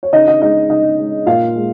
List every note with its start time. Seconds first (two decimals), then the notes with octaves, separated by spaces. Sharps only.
0.03 C#5
0.13 C#3 D#4 D#5
0.27 D#4 D#5
0.42 G#3 D#4 D#5
0.70 C#3 D#4 D#5
0.98 G#3
1.26 A#2 F4 F5
1.56 G#3